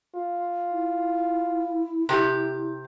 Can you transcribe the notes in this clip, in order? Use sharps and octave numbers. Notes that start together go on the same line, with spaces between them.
F4
E4
C3 G4